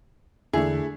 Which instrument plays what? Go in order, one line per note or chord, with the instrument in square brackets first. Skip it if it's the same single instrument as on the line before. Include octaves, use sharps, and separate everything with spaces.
[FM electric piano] E2 D3 [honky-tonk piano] A3 D4 E4 [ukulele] G#4